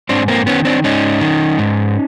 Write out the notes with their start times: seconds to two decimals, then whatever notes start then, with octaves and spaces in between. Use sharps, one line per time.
0.09 G#2 C4 D4
0.28 A#3 C4
0.46 D#3 B3 C#4
0.65 C4 D4
0.84 G#2 C#4 D#4
1.21 D#3
1.58 G#2